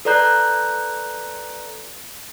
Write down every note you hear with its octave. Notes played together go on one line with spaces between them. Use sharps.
A4 B4 D5 A#5 F#6 G6